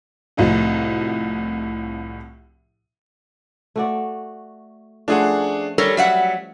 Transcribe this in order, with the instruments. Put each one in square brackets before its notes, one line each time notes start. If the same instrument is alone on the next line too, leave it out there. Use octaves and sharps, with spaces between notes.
[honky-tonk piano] C2 A2 F3 D#4 F#4
[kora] A3 F#4 D5
[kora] F3 A3 C#4 [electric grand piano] D4 G#4 F#5
[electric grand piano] G3 [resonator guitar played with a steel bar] A4 A#4 C#5
[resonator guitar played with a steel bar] F#3 E5 F#5